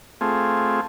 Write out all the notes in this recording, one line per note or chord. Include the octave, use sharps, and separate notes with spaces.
A3 C4 F4 G#4